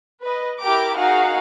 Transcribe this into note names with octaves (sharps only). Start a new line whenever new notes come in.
B4 D#5
E4 G4 A#4 G5 A#5 D6
D#4 F#4 G#4 A#4 F5 F#5